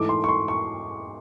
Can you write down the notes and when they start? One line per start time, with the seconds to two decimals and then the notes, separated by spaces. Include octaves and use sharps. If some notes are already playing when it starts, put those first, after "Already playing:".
Already playing: G#2 E3 A3 D6
0.09 C6
0.24 C#6
0.29 C6
0.48 C#6